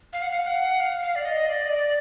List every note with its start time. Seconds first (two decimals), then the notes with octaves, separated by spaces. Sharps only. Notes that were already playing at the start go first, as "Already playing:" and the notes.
0.13 F5
0.22 F#5
0.31 F5
0.46 F#5
0.80 F5
1.02 F5
1.15 D5
1.25 D#5
1.48 D5
1.63 D#5
1.69 D5